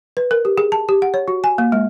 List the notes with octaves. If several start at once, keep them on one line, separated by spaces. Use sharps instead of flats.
B4
A#4
G4
G#4
A5
G4
F#5
C#5
F#4
G#5
A#3
G#3